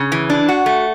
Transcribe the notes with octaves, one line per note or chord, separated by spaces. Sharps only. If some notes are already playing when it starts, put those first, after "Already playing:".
Already playing: C#3
E3
D4
F#4
A3